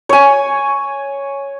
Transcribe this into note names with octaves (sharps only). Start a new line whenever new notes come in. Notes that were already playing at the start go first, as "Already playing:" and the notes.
C#5 G#5